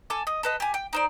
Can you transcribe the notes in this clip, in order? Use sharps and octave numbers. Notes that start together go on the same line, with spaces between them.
A4 G#5 D6
D#5
A4 B4 D#5
G4 G#5
G5
D#4 C5 D5